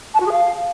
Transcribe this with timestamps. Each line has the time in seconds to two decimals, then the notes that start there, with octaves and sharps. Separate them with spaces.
0.14 A5
0.20 F#4
0.26 G#4
0.32 F5